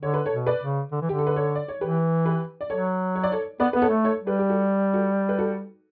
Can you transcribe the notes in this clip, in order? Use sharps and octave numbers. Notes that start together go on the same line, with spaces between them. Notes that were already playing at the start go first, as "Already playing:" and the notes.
D3 C#5
B4
A4 C#5
B2
B4 D5
C#3
D3
E3
D3 G4
A4
B4
A4 C#5
D5
C#5
E3 G4 B4
G4 B4
D5
F#3 A4 C#5
C#5
D5
A4 C#5
B3 B4 D5
B3 B4
A4 C#5
A3
A4 C#5
G3
G4 B4
G4
F#4 A4
F#4 A4
B4
F#4 A4